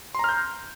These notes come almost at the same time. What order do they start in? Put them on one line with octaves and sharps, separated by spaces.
C6 A#5 F6 G6